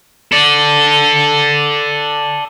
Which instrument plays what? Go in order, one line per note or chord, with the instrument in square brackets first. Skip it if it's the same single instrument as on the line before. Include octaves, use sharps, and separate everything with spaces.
[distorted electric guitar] A4 D5